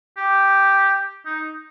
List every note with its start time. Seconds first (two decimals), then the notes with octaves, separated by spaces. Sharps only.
0.17 G4
1.26 D#4